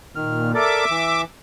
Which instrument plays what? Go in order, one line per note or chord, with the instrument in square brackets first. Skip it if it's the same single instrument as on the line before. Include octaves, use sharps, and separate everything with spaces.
[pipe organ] A#2 [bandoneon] D#3 F6
[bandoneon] A4 A#4 D5 [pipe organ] E5 D6
[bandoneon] E3